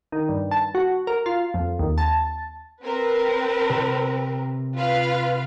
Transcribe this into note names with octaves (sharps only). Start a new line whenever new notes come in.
D#3
G2
A5
F#4
A#4
F4
F2
D#2
A5
C4 A#4 B4
C3
F4 B4 F5